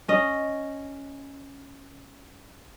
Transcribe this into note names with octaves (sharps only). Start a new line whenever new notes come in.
C#4 D#5